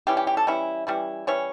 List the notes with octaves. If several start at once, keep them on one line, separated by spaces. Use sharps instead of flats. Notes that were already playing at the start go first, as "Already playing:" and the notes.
E3 G3 C#4 E4 G4
G4
G4
A4
E3 G3 C#4 E4
E3 G3 C#4 E4
E3 G3 C#4 E4 C#5